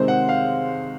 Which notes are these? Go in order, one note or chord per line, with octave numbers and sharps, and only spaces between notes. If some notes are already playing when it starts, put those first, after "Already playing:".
Already playing: C3 D#3 G#3 C4 C5
F#5
F5